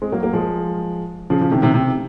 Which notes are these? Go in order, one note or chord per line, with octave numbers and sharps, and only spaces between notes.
G#3 C4
F#3 A#3
F#3 A#3
F3 G#3
C#3 F3
C#3 F3
C3 D#3
C3 D#3
C3